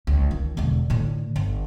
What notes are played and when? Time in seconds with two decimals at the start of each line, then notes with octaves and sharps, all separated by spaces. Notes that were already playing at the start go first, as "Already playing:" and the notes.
0.07 C#2
0.31 D#3
0.57 E1 D3
0.90 A2 D3
1.36 G1